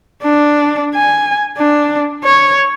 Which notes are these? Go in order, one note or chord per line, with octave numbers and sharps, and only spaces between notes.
D4
G#5
D4
C#5